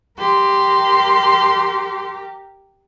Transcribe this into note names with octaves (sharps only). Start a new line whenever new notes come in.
G4 A#4 C6